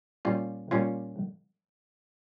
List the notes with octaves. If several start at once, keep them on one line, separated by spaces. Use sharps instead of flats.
A#2 G3 C#4 F4
A#2 G3 C#4 F4